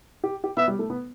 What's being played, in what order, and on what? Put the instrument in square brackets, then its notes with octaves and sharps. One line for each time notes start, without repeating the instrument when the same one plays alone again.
[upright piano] G4
G4
[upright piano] B3 [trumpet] E5
[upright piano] G3
A3
B3